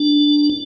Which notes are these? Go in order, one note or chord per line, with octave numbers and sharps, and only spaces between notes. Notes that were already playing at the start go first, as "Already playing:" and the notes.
Already playing: D4